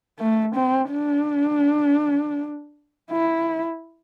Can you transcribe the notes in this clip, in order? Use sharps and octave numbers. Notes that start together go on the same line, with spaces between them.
A3
C4
D4
E4